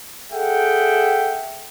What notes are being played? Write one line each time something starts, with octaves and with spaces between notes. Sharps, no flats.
G#4 A4 E5 F#5 G5